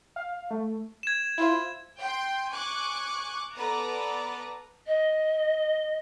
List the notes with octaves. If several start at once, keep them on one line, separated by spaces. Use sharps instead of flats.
F5
A3
G#6 E7
E4 F4 C5
G5 C6
G#5 C#6 D6 F#6
B3 A4 B4 D5 A#5
D#5